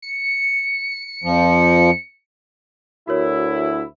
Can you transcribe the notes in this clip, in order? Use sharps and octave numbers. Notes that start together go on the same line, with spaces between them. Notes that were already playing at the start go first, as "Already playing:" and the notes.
C#7
F2 F3
D2 E4 F#4 A#4 C#5